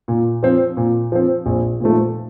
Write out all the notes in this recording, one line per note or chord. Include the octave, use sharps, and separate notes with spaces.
A#2
F3 C4
A#2
F3 C4
A#1
A#2 F3 A3